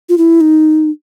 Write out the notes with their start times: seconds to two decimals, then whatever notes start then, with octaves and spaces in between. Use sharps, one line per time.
0.09 F4
0.18 E4
0.41 D#4